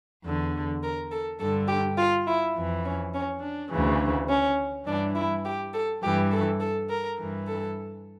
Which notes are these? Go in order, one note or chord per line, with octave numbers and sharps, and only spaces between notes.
E2 D3
A#4
A4
G2 D3 A4
G4
F4
E4
F2 E3
C#4
C#4
D4
D2 C#3 E3
C#4
G2 E3 D4
E4
G4
A4
G2 E3 G4
A4
A4
A#4
G2 E3
A4